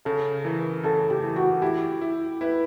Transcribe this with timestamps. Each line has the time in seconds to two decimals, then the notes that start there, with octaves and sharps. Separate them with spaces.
0.05 C#3 A4
0.44 E3 A#4
0.83 C#3 A4
1.10 G4
1.23 E3
1.36 F#4
1.62 E4 G4
2.01 E4
2.41 E4 B4